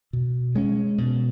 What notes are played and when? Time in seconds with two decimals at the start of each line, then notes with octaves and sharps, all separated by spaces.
0.13 B2
0.55 G#3 C#4
0.98 B2